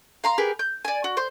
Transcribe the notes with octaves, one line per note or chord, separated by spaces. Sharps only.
F5 A#5 C6
G4 G#4 A#4 B4
G6
D5 G#5
F#4
C5